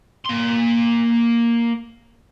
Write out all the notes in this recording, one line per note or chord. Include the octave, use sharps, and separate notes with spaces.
A#3 C6